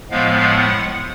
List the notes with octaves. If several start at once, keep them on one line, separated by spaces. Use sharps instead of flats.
A2 F3 G#3 B3 F5
F#5